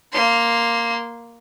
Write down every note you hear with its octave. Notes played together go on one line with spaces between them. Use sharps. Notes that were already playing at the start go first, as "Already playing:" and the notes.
A#3 C6